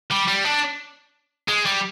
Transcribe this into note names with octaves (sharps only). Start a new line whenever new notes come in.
G3
G3
D4
G#3
G3